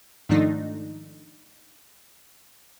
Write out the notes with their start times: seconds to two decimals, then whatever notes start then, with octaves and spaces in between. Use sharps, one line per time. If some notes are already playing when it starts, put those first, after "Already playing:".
0.29 G#2 D#3 F3 A3 D4 D#4